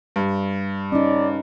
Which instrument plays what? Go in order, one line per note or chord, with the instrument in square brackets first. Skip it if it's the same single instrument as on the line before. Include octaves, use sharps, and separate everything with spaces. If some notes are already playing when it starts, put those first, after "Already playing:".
[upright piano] G2
[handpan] C#4 D#4 [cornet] D5